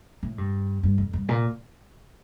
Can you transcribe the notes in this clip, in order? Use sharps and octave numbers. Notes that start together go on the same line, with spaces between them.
A2
G2
G2
F2
G2
A#2